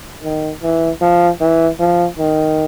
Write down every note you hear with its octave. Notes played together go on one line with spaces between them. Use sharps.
D#3
E3
F3
E3
F3
D#3